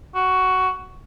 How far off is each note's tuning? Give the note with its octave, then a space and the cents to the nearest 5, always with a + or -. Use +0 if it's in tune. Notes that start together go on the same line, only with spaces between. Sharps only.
F#4 +10